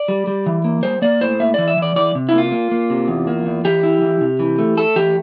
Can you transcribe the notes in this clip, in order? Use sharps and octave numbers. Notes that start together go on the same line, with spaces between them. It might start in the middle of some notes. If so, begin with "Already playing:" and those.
Already playing: D5
G3
G3
E3
A#3
G3 C5
A#3 D5
A2 C5
A#3 E5
E3 D5
E5
E3
D5
E3 D5
C3
E4
A#3 F4
A#3
A#3
C3
E2
A#3
E2
E3 G4
E4
E3
C3
E3
A3
A3 A4
E3 G4